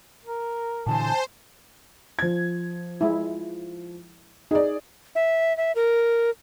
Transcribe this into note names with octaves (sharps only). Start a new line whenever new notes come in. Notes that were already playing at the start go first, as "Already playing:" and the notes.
A#4
A#2 D3 E3 C5 G#5 A5
F3 G#6
G#3 E4
D#4 G#4 D5
E5
E5
A#4